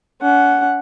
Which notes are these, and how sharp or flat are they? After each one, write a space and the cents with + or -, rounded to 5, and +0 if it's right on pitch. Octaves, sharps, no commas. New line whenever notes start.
C#4 +45 F#5 +0